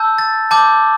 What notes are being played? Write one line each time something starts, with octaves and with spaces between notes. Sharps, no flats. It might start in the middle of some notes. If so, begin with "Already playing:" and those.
Already playing: A5 E6 G6
A6
A5 D6 G6